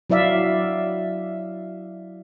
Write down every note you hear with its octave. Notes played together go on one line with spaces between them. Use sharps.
F#3 E4 D5 E5 F5